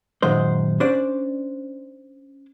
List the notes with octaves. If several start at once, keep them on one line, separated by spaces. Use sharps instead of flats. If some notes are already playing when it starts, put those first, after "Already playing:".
F#2 A#2 D#3 G#3 C5
C#4 D4 C5 D5